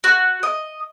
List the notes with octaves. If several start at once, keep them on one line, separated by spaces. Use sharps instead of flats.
F#4
D#5